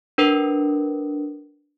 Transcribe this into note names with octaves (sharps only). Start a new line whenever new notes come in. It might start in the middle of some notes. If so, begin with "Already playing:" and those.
D4 A#4 B4